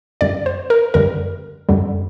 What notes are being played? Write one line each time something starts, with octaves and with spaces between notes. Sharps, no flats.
F#2 D3 G3 D5
C5
A#4
F#2 D3 G3 A#4
F#2 D3 G3